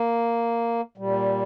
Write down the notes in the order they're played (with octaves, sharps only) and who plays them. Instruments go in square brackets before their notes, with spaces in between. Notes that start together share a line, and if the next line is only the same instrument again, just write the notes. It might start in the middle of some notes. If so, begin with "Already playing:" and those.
Already playing: [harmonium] A#3
A#2 G3